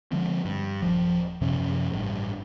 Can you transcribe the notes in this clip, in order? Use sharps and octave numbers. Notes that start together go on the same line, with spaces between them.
D3 F3 G#3 C4
G2
D#1 F3
F#2 C3 F3 C#4
A1 G2